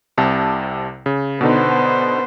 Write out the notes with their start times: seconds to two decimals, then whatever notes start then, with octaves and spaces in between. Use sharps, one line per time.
0.18 C2 C3 A5
1.06 C#3
1.41 B2 D3 B3 D#4 C5